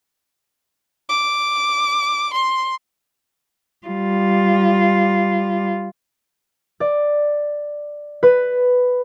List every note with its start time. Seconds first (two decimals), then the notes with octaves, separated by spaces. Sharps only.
1.09 D6
2.34 C6
3.87 G3 F4
6.80 D5
8.23 B4